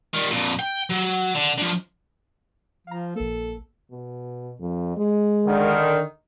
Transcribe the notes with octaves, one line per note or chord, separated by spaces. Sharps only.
D#3 G3
F2 A#2
G5
F#3
D3
D3 F3
F3 F5 A#5
A#1 A#3 A4
B2
F2
G#3
D3 D#3